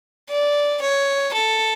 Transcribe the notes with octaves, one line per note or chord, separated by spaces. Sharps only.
D5
C#5
A4